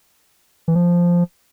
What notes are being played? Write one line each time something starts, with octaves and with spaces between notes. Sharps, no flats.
E3
F3